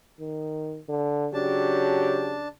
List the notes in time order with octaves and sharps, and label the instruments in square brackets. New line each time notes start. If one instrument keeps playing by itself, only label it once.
[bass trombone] D#3
D3
[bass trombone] C#3 [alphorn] F#3 [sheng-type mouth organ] D4 A5 [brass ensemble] G4